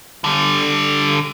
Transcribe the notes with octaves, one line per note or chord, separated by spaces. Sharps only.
D3 G3